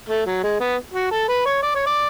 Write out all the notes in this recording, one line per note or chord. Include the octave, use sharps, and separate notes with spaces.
A3
F#3
G#3
B3
F#4
A4
B4
C#5
D5
C#5
D5